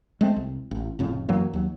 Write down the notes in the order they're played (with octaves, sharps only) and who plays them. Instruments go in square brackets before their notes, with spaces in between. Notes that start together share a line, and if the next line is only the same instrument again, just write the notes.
[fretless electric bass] G#3 A3 C4
C2
A1
F1 F2 A2 C#3
F#2 E3 F#3 A#3
D#2 F#3